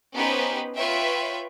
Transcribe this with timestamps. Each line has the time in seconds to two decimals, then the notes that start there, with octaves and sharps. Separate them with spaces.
0.14 B3 C#4 D#4 G4 B4 C5
0.75 F4 B4 C#5 E5 G5